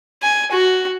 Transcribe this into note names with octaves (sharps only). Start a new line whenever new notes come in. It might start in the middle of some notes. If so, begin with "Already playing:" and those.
G#5
F#4